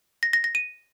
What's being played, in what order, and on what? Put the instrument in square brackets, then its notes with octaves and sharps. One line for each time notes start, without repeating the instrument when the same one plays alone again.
[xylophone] A#6
A#6
A#6
D#7